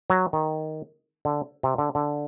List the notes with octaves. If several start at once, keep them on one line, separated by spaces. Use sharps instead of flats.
F#3
D#3
D3
C3
D3
D3